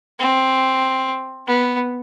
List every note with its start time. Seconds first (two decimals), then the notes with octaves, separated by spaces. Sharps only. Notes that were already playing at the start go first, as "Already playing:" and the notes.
0.19 C4
1.47 B3